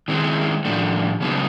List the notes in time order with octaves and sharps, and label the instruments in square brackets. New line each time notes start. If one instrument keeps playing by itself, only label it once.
[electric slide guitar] D#3 G#3 C4 E4
A2 F3 A3 D4
C#3 F#3 B3 D#4